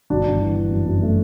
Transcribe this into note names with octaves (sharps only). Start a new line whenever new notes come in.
G1 D4 F#4
G1
E3
E3
F#2
F#2
A3